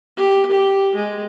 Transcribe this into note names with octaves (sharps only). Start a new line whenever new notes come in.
G4
G4
G#3